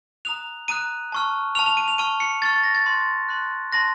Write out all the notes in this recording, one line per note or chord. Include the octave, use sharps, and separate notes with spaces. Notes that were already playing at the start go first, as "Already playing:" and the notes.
A#5 D#6 F#6 F7
A#5 D#6 F#6 D#7
A5 C#6 F6
A5 C#6 F6 F7
F7
D#7
F7
A5 C#6 F6 D#7
C#7
A5 C#6 F6 A6
A6
A#6
A6
A5 C6 F#6
A5 C6 F#6
A5 C6 F#6 A#6